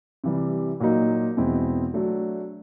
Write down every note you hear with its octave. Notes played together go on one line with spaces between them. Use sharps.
C3 E3 G3
A#2 F#3 A#3 D#4
E2 B2 G#3 C4 E4
F#3 A3 D4